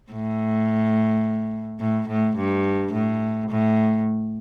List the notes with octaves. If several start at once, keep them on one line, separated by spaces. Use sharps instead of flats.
A2
A2
A2
G2
A2
A2